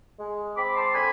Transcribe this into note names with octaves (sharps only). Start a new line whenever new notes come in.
G#3
C4 B5 D6
A5 C6
D3 G#5 B5